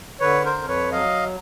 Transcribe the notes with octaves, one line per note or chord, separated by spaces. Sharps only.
D3 B4 C#5
A#4 C5
F2
B4 C#5
F#3 D#5 F5